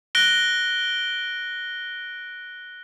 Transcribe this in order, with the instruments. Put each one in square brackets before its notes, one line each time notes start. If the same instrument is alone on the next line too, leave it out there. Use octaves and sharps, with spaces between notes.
[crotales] F#6 A#6 D7 G7